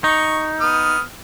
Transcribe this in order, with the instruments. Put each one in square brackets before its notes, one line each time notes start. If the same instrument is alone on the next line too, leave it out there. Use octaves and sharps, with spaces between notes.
[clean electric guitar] D#4 [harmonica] C#6
[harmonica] B3 D#6 F6